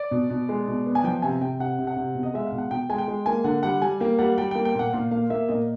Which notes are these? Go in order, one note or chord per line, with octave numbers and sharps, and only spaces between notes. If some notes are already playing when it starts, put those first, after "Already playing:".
Already playing: D5
B2
B2
G#3
B2
B3
G#5
F3 G5
C3 G#5
C3 G5
C3 F#5
C3
F#5
C3
B2
D#5
G#3 E5
F5
B2
F#5
B2 G5
G#3 G#5
G5
G#3
A#3 G#5
D3 F#5
G3 F#5
G3 G#5
A#3 G5
G3 F#5
G3 G5
A#3 G5
G5
A#2 F#5
A#2 F5
A#3 F5
A#3 E5
A#2 D#5